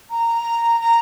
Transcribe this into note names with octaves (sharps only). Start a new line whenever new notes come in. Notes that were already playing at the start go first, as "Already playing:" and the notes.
A#5
A#5